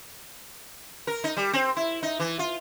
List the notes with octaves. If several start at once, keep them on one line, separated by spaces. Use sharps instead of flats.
A#4
D#4
G3
C4
E4
D#4
E3
F4